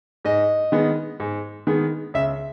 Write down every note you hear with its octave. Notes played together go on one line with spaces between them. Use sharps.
G#2 D#5
D#3 G#3 B3
G#2
D#3 G#3 B3
C#2 E5